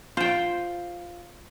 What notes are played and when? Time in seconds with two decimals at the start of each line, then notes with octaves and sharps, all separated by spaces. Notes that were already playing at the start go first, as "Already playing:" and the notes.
0.17 F4 C5 G5